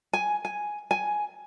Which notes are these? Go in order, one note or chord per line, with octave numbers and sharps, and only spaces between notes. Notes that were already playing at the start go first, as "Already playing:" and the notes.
G#5
G#5
G#5